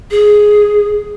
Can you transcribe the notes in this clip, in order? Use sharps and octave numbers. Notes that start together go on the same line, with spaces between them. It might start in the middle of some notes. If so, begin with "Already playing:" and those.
G#4